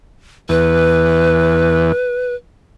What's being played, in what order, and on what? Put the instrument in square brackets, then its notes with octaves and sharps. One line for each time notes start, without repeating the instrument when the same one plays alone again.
[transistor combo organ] E2 [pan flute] B4